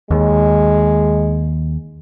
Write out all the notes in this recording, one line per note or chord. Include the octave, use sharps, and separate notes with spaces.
D#2 G#3